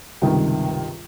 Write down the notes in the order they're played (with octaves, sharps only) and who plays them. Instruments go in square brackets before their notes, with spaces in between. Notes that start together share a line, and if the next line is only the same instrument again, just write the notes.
[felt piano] C#2 G2 C3 D#3